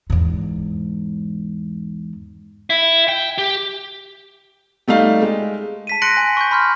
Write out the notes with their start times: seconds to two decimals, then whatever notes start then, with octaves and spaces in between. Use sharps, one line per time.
0.10 E2 G#2
2.70 E4
3.09 G5
3.38 G4
4.88 G3 A3 D#4 F5
5.22 G#3
5.87 A5 B6 D#7
6.02 C6 F#6 A#6 C#7 D7 F#7
6.17 G#5
6.37 C#6 G6
6.51 B5 C6 F6 G6